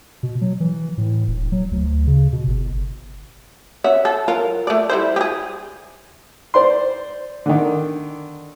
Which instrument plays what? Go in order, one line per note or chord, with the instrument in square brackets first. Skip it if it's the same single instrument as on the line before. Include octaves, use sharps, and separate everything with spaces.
[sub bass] B2
F#3
E3
A2
E1
F#3
D2
C#3
B2
G1
[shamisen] C#4 E5 F#5
A4
F#3 F4 A#4
A3 D5
G3 E4 C5
G4 G#4
[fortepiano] C5 D5 C6
D3 D#3